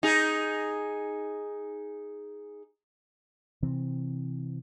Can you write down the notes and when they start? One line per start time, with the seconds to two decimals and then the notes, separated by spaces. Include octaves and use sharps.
0.03 D#4 G#4
3.62 C3 E3 C4